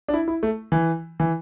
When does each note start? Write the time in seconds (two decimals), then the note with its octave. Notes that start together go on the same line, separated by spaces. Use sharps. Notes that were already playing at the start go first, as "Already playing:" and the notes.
0.08 D4
0.14 E4
0.28 E4
0.43 A3
0.72 E3
1.20 E3